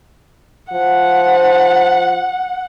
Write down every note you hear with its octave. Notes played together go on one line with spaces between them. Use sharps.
F3 F#5